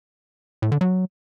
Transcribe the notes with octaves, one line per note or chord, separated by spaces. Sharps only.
A2
D3
F#3